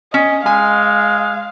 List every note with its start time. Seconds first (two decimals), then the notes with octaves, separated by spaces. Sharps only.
0.14 C#4 D#5
0.46 G#3 F5 G#5